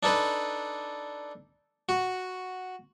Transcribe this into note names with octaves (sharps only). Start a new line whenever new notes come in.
D4 D#4 A4 B4
F#4